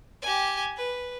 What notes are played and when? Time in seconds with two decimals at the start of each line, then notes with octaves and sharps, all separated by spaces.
0.22 G4 G#5
0.77 B4